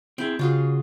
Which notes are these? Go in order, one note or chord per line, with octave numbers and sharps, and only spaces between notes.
C4 E4 G#4 G5
C#3 F4 F#4 G#4